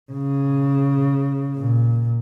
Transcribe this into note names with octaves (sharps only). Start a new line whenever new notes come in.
C#3
A#2